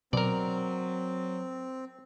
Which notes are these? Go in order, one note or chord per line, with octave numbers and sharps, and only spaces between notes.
B2 F#3 C4 A#4 D5